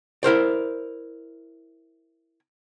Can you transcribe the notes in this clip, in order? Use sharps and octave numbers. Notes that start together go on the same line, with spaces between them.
E4 A#4 C5 D5